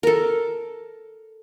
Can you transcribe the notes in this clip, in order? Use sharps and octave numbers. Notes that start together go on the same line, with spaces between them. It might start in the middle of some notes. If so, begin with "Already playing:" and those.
A4 A#4